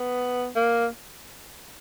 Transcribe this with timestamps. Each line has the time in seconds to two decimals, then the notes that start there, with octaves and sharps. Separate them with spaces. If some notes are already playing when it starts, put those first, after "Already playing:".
Already playing: B3
0.56 A#3